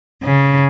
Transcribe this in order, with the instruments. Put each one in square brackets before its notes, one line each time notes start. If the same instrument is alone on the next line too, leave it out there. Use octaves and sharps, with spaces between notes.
[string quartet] C#3